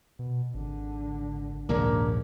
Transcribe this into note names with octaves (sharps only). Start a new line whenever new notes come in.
B2
G#1 D3
A#1 D#2 G#2 C#3 A#3 D4 A#4 D5